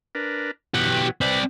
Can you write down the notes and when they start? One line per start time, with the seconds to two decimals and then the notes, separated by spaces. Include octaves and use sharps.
0.15 D4 A#4 B4
0.74 B2 E3 F#3 G4 F#5
1.21 C4 B4 C5 D5 B5